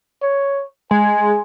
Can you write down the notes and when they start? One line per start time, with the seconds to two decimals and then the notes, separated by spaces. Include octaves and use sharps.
0.22 C#5
0.91 G#3 G#5